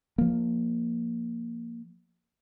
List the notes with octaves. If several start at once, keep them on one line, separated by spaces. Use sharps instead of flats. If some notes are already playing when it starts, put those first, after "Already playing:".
F3 A#3